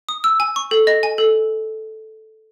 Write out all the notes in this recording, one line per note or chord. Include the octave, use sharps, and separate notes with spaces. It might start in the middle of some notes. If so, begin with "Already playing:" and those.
D#6
E6
G#5
C#6
A4
D#5
G#5
A4